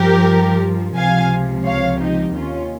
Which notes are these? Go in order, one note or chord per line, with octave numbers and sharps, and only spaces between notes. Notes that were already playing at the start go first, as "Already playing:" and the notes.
Already playing: G2 F3 G4 A#4
C#2 C3 F3 F5 G#5
C#5 F5
D#4 G4
D#2 D#3 C#4 F4